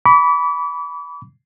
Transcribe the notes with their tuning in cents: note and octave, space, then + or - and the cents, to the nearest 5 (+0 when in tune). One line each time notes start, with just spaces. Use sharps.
B5 -5 D6 -40